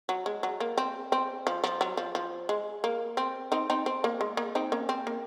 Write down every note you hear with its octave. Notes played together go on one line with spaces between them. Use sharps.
F#3
G#3
F#3
A#3
C4
C4
F3
F3
F#3
F3
F3
G#3
A#3
C4
C4 D#4
C4 D#4
C4
A#3
G#3
A#3
C4 D#4
A#3 C#4
C4
A#3